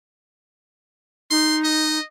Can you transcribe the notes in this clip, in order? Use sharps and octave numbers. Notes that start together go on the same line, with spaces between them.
D#4 C6
D#5